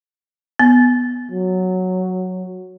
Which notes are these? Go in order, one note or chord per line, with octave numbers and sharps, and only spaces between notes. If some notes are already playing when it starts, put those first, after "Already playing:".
B3
F#3